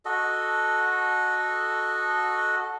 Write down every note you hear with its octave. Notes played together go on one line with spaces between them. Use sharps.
F#4 A4 D#5